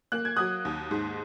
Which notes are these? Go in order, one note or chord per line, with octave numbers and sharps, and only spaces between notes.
A#3 F#6
G#6
F#3 D#6 F#6
D#2
G#2